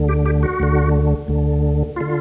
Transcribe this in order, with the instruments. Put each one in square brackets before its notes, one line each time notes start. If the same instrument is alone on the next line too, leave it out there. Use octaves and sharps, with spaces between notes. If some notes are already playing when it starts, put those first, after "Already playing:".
Already playing: [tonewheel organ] D2 D3
G4
G4
F#4
D2 D3
D2 D3
D3 F4